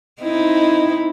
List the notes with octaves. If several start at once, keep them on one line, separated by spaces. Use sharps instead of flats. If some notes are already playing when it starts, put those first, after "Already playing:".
C4 D#4 E4